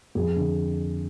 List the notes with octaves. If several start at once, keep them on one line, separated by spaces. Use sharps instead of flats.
F2 G#4
D3